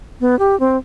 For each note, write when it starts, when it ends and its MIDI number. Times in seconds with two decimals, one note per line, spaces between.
0.21 0.38 59
0.39 0.58 67
0.60 0.77 60